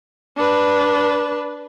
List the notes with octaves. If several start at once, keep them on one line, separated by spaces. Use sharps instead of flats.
D4 B4